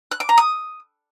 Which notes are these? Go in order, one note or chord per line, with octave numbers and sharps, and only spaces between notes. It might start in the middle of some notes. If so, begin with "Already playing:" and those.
F#6
D6
A#5
D#6